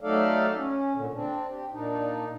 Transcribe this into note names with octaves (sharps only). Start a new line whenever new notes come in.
F#3 A3 D#4 A4 D5 F5
C#4
A#2 D3
C4 D4
G4
A#2 D4 D#4